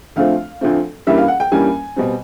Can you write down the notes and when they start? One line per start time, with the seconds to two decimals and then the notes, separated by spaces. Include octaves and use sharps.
0.16 D2 D3 F3 A3 C4 F5
0.61 D2 D3 F3 A3 C4
1.07 G2 E3 G3 A#3 C#4 E5
1.18 F5
1.28 F#5
1.40 G5
1.51 G2 E3 G3 A#3 C#4 G#5
1.96 B2 G3 C4